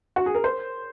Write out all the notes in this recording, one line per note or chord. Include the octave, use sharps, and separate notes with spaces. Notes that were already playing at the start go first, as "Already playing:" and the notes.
F#4
G#4
A#4
C5